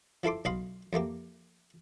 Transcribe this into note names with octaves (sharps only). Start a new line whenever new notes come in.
F3 E4 A4 C6 D6
B1 D#5 F5 B5 C6
F2 A3 A#3 G4